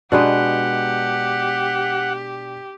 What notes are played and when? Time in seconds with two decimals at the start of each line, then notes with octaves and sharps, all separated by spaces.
0.12 B2 G#3 D4 G4 B4 F#5